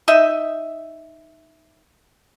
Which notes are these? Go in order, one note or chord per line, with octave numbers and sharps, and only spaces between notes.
D#4 D#5 E5